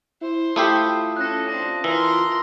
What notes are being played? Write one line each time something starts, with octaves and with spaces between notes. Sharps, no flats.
E4 C5
A3 E4 F4 G4 D#6 C7
C#4 A4 F#6 A#6
C4 D4 A5 A#6
E3 A#4 C6 E6